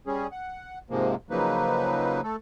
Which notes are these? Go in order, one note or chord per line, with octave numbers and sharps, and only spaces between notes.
G3 C#4 G#4
F#5
G#2 C3 F3 G#3 A#3
C#3 F3 F#3 A#3 D#4 B4
A3 A4